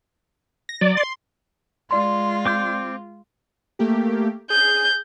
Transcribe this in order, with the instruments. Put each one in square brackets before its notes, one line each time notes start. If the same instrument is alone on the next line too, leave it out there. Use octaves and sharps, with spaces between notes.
[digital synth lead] A#6
[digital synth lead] F#3 [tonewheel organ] D5
[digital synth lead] C6
[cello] G#3 F4 [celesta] D5 C6
[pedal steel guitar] C4 D6 G6
[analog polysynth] A3 A#3 G4
[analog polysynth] G#4 [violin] G6